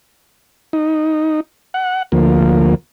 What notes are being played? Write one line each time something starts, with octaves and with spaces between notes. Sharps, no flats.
D#4
F#5
D2 F3 A#3